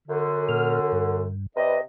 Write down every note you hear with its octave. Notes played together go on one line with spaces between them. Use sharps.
F#2 D3
A#2 F6
G2
C3 B4 D5 D#5